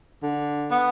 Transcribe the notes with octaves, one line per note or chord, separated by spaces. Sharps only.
D3
B3